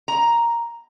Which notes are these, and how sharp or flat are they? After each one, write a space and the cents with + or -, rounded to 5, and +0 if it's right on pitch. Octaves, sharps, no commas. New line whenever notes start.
A#5 +5